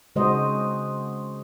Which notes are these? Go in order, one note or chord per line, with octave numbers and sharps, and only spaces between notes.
C#3 G#3 F#4 C5 D#5